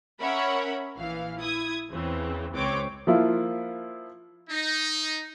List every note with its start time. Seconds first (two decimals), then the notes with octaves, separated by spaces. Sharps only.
0.20 C#4 A#4 C#5 E5 F#5 B5
0.98 A#1 E3 F5
1.39 E4 D#6 G#6
1.91 E2 C#3 E3 C4
2.54 C#2 C4 B4 C#5 D6
3.07 F3 A#3 E4 F4
4.50 D#4